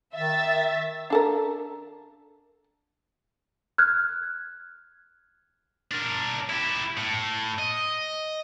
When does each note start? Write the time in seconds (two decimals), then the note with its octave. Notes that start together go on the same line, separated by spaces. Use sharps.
0.15 D#3 E5 A6
1.10 D4 A4 A#4
3.78 F6 F#6 G#6
5.91 D4 A#4
6.50 E4 G4
6.97 A2
7.58 D#5